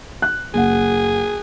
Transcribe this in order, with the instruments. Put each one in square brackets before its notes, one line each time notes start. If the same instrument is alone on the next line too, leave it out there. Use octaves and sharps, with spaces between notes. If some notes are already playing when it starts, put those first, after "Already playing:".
[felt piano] F#6
[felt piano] F#1 F#5 [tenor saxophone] G#4